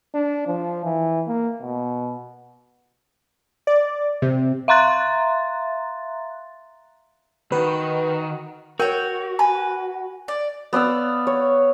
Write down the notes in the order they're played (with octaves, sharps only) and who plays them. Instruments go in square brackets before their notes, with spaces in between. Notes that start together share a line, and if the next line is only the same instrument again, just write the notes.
[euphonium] D4
F3
E3
A#3
B2
[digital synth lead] D5
C3
[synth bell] E5 F5 A#5 C6 F#6 A6
[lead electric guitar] D#3 [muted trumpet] F#4 [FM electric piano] B4
[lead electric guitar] F#4 [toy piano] A#4 [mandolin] C#5 G5
[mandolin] B4 [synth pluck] G#5
[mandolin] D5
[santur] B3 D5 F5 E6
C#5